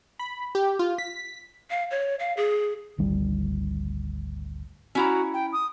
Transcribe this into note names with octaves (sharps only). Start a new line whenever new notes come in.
B5
G4
F4
B6
F5
C#5
F5
G#4
G#1 D2 G3
C#4 E4 F#4 A#5
G5
D#6